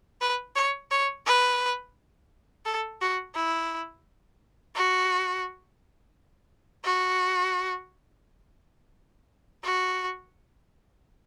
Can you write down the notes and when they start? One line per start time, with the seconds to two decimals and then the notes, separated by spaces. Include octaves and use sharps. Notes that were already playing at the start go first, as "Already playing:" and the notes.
0.21 B4
0.56 C#5
0.91 C#5
1.26 B4
2.66 A4
3.01 F#4
3.35 E4
4.76 F#4
6.85 F#4
9.64 F#4